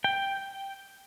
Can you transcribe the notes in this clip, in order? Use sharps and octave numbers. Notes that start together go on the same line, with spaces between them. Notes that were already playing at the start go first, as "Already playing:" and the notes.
G5